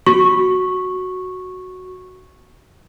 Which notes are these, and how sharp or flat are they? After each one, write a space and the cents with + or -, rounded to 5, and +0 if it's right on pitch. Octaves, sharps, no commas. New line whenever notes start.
F#4 +0 C#6 -10